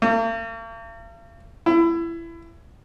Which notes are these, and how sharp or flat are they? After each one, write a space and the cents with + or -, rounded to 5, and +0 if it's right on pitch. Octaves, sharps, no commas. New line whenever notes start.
A#3 -45
E4 +25